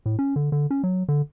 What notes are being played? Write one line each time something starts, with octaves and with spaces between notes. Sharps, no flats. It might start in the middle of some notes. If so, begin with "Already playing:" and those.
A2
C#4
D3
D3
C#4
F#3
D3